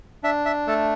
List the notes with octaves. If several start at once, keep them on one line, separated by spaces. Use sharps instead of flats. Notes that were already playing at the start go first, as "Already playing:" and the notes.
D4 E5
E5
A3 A4